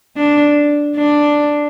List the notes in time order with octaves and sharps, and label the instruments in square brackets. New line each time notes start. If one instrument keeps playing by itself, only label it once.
[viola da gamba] D4
D4